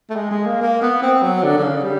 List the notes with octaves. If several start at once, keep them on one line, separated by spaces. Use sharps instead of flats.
A3
G#3
G#3
A#3
A#3
B3
C4
F#3
D3
D3
C#3
G3